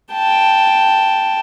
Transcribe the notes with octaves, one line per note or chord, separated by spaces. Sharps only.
G5 A5